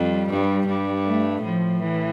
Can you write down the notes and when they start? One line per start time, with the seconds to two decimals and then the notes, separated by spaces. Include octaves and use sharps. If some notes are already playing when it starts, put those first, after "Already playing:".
Already playing: F2 G3
0.30 G2
0.67 G2
1.06 A3
1.43 A2 F3
1.81 E3